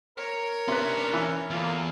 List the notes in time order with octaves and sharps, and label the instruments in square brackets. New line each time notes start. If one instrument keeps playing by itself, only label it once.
[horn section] A#4 [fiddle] C#5
[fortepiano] C3 B4 [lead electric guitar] C#4 D4
[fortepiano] E3
[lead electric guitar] E2 [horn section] A#3 F4 A4